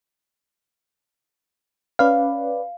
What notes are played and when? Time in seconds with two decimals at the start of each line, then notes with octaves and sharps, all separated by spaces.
1.99 C#4 B4 D5 F5